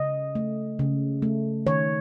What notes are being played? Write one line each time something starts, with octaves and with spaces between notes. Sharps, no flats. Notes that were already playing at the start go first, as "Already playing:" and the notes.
Already playing: C#3 D#5
A3
C#3
A3
D#3 C#5